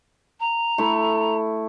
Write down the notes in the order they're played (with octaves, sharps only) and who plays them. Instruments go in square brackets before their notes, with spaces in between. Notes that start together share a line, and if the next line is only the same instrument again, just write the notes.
[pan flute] A#5
[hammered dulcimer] A3 E4